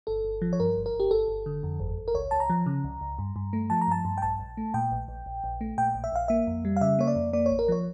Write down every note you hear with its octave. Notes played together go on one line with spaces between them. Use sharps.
G1 A4
G1
F3
C#5
G2 A#4
G1
A#4
G1
G4
G1 A4
G1
D3
F2
G1
G1
A#4
C#2 C#5
C#2 A5
A#5
F3
C#3
C#2
C#2
G2
G2
A3
F3 A5
A#5
G2 A5
G2
G5
A#1 A5
A#1
A3
A#2 G5
A#1
A#1
A#1
A#1
A3
A#2 G5
A#1
E5
A#1 F5
A#3 E5
F2
G3
F5
C#3 E5
A#3 C#5
D5
F2
A#3 D5
A1 C#5
A#4
F3 C#5